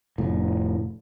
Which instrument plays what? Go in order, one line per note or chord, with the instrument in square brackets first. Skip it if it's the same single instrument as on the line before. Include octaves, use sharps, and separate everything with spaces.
[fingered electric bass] F1 A2